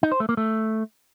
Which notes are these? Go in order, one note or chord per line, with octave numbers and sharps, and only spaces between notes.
D#4
C5
A3
A#3
A3